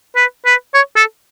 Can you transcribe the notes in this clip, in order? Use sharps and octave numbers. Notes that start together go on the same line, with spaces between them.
B4
B4
C#5
A4